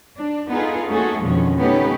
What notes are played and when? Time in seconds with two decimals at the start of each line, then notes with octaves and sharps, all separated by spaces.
0.15 D4
0.50 B3 D#4 F4 G#4 A4
0.92 A3 A#3 C#4 F#4 G#4 A4
1.23 F2 B2 D3 D#3 F3 C#4
1.59 A3 B3 C#4 D#4 E4 G4